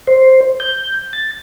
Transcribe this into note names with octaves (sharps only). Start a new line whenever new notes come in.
C5
G6
A6